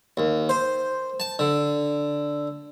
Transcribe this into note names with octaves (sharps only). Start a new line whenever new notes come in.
D#2
C5
A5
D3